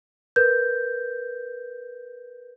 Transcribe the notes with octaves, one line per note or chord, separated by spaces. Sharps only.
A#4 B4 G6